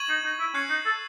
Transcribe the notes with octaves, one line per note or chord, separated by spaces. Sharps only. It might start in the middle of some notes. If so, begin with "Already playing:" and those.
Already playing: C#6 G#6 D#7 F#7
D#4
D#4
E4
C#4 C#6 F#6 C7
D#4
A4